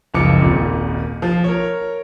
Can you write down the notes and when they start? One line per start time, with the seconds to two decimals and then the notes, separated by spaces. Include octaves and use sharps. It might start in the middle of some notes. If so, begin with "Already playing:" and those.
0.14 F#1 C#2 F3 D6 C#7
0.39 D#1 G#1 A#2
1.22 F3
1.44 A#4 C#5